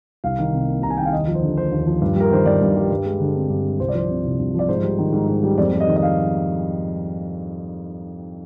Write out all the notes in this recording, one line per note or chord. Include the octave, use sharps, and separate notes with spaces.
C2 F5
D#3
C3
A#3
C2 A#5
G#5
D#3 G5
F5
D#2 D#5
F3
C5
D3
A#3 C5
D#2
F3
G2
G3 A#4
D#3 C5
G2 D5
G2
G3
G2
G#3
D3
C4
G2
G#3
C2 C5
D5
F3 C5
C3
C2
C2
F3 D5
G#2 C5
G3
D#3
G#2
G#2
G3
F2 D5
G3
D#5
D#3
D#5
F5